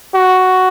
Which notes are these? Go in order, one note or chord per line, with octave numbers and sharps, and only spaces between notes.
F#4